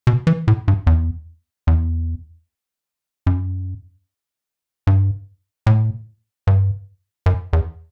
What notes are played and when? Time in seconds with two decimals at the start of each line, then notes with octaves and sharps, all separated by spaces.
0.07 B2
0.27 E3
0.48 A2
0.68 G2
0.87 E2
1.67 E2
3.26 F#2
4.87 G2
5.66 A2
6.47 G2
7.26 F#2
7.53 E2